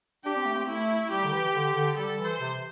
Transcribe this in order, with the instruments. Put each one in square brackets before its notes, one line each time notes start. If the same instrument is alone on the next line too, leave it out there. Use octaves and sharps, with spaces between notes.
[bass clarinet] D4 [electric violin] G4
[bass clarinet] C4
A3
C4
[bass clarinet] A3 [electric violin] E4
[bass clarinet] G3 [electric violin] G4
[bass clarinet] D3
E3
D3
D3
[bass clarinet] G3 [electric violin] A4
[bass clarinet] E3
[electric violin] C5
[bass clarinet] C3